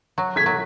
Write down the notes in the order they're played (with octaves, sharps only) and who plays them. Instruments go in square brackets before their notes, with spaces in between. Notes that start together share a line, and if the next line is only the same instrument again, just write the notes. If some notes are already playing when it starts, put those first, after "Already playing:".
[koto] F#3
[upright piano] G#6 B6
[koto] F#3